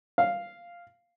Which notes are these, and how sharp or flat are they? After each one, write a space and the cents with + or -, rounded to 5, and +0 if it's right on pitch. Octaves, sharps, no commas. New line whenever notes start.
F5 -5